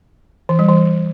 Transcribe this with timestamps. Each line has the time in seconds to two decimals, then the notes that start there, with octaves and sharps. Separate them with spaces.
0.49 E3
0.59 G3
0.69 E3